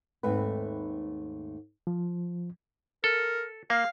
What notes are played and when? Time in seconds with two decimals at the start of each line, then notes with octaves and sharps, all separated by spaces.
0.23 D#2 G#2 A3 C4 B4
1.87 F3
3.04 A4 A#4
3.70 A#3 F5